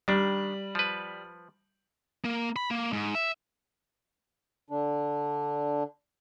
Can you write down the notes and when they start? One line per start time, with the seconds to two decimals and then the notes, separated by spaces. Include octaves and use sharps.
0.08 D#3 G3 D4
0.75 F3 B4
2.25 A#3
2.56 B5
2.71 A#3
2.93 G#2
3.15 E5
4.70 D3 D4